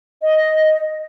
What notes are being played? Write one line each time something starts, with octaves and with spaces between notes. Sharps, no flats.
D#5